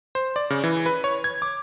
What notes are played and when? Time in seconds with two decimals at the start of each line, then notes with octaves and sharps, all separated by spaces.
0.15 C5
0.36 D5
0.50 C#3
0.64 E3
0.86 B4
1.04 C#5
1.24 G#6
1.42 D6